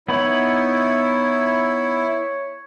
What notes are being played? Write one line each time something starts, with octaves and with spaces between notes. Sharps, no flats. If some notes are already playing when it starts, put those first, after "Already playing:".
B3 D#4 E4 C#5 B5